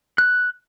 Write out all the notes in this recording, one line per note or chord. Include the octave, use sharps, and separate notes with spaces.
F#6